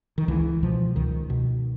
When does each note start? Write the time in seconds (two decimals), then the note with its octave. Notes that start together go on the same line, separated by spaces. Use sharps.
0.18 D#3
0.28 C#2 E3
0.63 B2 F3
0.96 C#2 D#3
1.30 B2